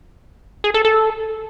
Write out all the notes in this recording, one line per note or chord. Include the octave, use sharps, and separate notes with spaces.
G#4
A4
A4